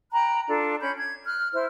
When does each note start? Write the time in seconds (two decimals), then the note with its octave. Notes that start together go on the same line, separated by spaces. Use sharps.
0.11 G5 A#5 B5 F#6
0.48 D4 F4 A4
0.81 C#4 B5 G6
0.97 G#6
1.25 F6 F#6
1.52 E4 C5 F6